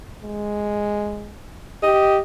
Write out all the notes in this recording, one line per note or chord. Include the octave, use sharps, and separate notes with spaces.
G#3
G4 D#5